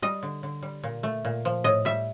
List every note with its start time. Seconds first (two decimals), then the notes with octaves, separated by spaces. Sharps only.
0.02 G3 D#5
0.23 D3
0.43 D3
0.63 G3
0.84 A#2
1.03 A3
1.25 A#2
1.45 F3
1.64 A2 D#5
1.85 G3 E5